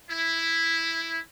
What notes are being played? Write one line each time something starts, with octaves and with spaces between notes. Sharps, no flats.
E4